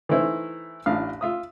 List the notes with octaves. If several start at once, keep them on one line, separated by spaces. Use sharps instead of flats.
E3 A3 D#4 E4 C5
A1 D4 F5
F4 E5 D#6